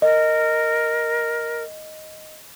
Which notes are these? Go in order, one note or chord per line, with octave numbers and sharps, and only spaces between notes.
A#4 D#5